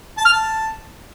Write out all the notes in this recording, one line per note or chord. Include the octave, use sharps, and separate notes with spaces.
A5
F6
A5